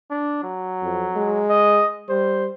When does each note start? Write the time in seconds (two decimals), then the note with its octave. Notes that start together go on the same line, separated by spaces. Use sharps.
0.11 D4
0.43 F#3
0.83 F2
1.16 G#3
1.50 D#5
2.09 G3 C5